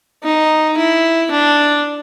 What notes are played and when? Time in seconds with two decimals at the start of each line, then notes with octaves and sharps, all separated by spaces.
0.24 D#4
0.77 E4
1.31 D4